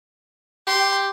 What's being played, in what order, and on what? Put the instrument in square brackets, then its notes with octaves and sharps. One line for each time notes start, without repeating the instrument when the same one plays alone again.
[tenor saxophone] G4 [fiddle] C6